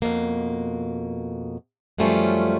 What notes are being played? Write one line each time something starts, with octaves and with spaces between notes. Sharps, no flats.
F2 B2 A#3
F#2 F3 G3 A3 C#4 F4